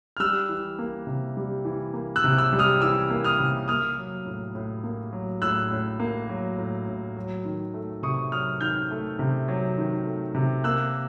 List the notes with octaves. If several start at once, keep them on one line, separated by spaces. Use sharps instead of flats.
F6
G3 E6 F#6
E3
A#3
C3
G3
E3
A#3
E6 F#6
C3
E6 F#6
G3
D#6 F6
E3 D6 E6
A#3
D#6 F6
C3
A#3 D#6 F6
F#3
A2
A2
A#3
F#3
A2 E6 F#6
A2
A#3
F#3
A2
A2
F#3
D#3
A3
C3 C#6 D#6
F#3 D#6 F6
D#3 F6 G6
A3
C3
F#3
D#3
A3
C3
A#3 E6 F#6